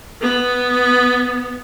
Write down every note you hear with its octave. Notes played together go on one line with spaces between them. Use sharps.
B3